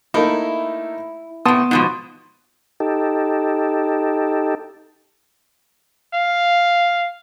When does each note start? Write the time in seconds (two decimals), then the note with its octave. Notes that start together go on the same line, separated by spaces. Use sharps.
0.14 A3 A#3 D#4 E4
1.46 A2 C3 B3 A5 C6 D#6
1.71 G#2 B2 F3
2.80 D#4 G4 A4
6.14 F5